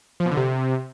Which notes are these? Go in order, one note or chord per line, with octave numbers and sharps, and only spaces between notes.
F3
B2
D3
C3